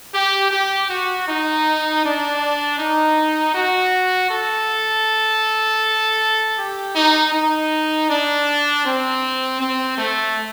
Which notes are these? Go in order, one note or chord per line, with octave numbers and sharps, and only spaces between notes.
G4
G4
F#4
D#4
D4
D#4
F#4
A4
G4
D#4
D#4
D4
C4
C4
A3